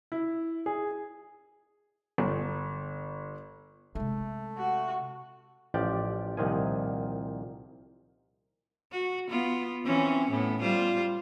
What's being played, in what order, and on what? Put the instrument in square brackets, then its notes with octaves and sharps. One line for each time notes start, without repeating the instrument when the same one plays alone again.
[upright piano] E4
G#4
[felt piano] G1
[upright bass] C3 G#3 [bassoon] A3
[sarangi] F#4
[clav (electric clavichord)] A1 F3 G4 D5 G5
C2 A#2 D#3 F3 G#5
[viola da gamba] F#4
B3 F4
E3 C4 C#4
A2 B3
G3 F4 C5